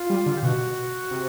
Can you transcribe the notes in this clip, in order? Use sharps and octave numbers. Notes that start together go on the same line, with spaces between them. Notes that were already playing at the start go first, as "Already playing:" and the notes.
Already playing: F4
G3
D3
G4
B2 F#4
C3